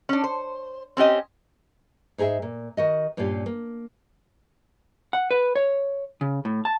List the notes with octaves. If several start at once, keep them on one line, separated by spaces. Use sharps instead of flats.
C#4 D4
C5
C4 C#4 G4 D#5
G#2 D#4 G#4 A#4 E5
A#2
D#3 F#4 D#5
G2 A#2 C#4 F4 G4
A#3
F#5
B4
C#5
C#3
A2
A5